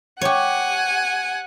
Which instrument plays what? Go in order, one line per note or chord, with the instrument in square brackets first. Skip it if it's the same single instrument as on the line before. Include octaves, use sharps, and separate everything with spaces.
[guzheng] G4 C#5 [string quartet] F#5 G#5